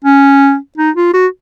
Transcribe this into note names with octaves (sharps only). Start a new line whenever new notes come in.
C#4
D#4
F4
F#4